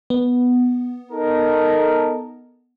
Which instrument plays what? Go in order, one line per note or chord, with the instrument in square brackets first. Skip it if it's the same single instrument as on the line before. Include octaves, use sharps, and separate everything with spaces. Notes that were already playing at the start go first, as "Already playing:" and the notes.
[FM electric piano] B3
[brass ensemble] D#4 A4 A#4